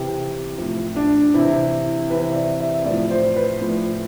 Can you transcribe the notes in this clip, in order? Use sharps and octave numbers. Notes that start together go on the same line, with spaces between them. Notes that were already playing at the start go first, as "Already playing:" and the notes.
Already playing: C3 E3 G4
A2 F3
D4
C3 E3 E4
C3 E3 B4
E5
D5
E5
A2 F3 D5
C5
B4
A2 F3